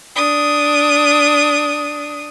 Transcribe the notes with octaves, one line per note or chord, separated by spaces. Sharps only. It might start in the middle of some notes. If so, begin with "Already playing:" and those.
D4 D#6